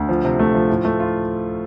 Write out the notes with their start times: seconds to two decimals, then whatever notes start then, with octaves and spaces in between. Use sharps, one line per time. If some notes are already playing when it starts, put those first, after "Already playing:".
Already playing: D2
0.09 F3
0.24 C3
0.39 A3
0.54 F3
0.70 A2
0.85 A3
1.00 F4